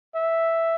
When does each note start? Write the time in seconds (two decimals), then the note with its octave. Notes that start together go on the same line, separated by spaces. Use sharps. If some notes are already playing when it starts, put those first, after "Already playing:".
0.16 E5